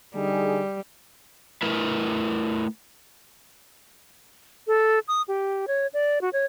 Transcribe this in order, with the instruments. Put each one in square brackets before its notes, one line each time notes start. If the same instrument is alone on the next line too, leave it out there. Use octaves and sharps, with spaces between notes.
[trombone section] D3 D#4 G#4 [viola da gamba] G3
[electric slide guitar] A3 E4 A#4 B4
[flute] A4
D#6
G4
C#5
D5
F#4
C#5